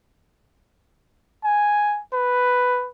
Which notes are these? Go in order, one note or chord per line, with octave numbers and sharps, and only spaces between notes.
G#5
B4